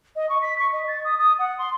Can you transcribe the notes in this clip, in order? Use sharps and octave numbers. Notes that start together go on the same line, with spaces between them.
D#5
C#6
B6
C#6
D#5
A6
D#6
D#6
F#5
C6